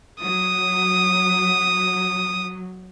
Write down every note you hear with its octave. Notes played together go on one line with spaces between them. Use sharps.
F#3 D#6